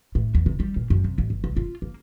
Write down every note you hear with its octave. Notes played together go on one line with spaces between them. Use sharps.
A2
E2
C3
G3
A#2
F#2
C3
A1
G1
C2
F4
A#3